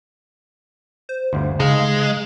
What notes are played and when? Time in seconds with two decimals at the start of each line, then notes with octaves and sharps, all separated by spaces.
1.09 C5
1.33 G1 D2
1.60 C#3 G#3 D#4 F5